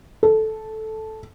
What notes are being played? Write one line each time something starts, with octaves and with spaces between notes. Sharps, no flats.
A4